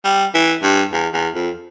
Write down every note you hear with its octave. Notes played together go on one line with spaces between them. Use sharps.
G3
E3
G2
E2
E2
F2